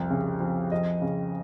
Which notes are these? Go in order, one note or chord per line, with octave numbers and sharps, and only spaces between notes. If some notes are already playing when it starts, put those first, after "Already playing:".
Already playing: C2 F2
C#3
F2
F2 D#5
C#3